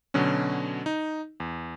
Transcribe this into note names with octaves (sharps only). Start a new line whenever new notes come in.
B2 D3 F#3 C#4
D#4
E2